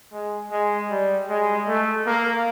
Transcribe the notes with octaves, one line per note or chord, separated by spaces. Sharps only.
G#3
G#3
G3
G#3
A3
A#3